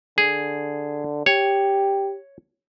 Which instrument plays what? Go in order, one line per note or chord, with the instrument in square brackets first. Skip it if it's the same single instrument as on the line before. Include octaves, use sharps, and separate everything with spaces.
[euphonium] D3 [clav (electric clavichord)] G#4
[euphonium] G4 [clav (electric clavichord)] C#5